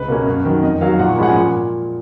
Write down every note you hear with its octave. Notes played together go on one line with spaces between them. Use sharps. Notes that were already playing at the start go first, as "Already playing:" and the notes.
Already playing: C#2 B4
B2 A#3 C#4
F#2
D#3 F#3
F2 D#5
D#3 F#3 F5
A#2 F#5
C#6
F3 G#3 C#4 F#5 B5
G#5
A#2